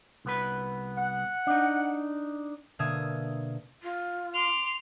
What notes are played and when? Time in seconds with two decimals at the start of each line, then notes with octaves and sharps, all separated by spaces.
0.25 C2 B3 B4
0.97 F#5
1.47 D4 D#4
2.79 B2 D3 A#3 E5 D#6 G#6
3.83 F4
4.34 C6 D6 F7